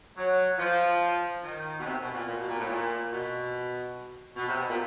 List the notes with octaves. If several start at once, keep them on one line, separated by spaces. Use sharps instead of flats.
F#3
F3
D#3
B2
C3
B2
A#2
A#2
B2
A#2
A2
A#2
B2
B2
C3
B2
A#2